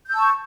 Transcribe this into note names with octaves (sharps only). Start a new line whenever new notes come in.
A5 C#6 E6 G6